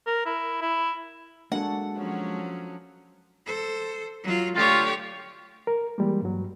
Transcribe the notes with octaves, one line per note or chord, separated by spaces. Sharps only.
A#4
E4
E4
G#3 A#3 D4 F#4 A4 F#5
F3 F#3 C#4
A4 C5
F#3 F4
D3 A3 F4 G4 C#5
A#4
E3 G3 G#3 A#3
G2 F#3